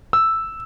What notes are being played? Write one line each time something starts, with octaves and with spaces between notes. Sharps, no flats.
E6